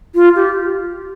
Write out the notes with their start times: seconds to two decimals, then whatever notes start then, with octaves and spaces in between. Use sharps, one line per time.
0.15 F4
0.36 G4